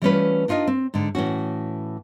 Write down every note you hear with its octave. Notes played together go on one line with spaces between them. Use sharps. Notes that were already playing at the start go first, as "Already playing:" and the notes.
E3 G3 A3 C#4 F4 B4
D4 D#4 F4 A#4 D#5
C4
G#2 D3
A2 E3 C#4 F#4